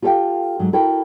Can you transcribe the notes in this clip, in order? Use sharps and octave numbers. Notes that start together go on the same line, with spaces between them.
F4 G4 A4 C5 F5 G5
G#2 F#3
E4 F#4 A4 A#4 G5